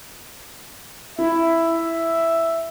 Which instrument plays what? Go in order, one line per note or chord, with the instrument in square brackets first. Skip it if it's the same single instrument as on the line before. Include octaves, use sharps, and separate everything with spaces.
[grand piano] E4 [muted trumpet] E5